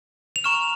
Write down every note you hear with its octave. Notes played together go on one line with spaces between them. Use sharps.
F7
A#5 C#6 F6 E7